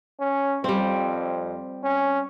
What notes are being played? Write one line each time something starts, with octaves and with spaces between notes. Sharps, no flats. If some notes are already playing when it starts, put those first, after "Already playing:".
C#4
F2 G3 C4
C#4